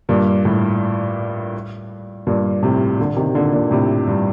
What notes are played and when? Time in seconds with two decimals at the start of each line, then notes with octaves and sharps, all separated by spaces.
0.09 G2 A#2
0.45 A2
2.27 G2 A#2
2.63 A2 C3
2.99 A#2 D3
3.16 C3 D#3
3.35 A#2 D3
3.53 A#2 D3
3.71 A2 C3
4.07 G2